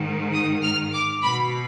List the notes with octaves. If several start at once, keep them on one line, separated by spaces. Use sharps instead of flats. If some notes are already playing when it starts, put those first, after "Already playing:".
Already playing: G#2 D#3
D#6
F6
D6
B2 B5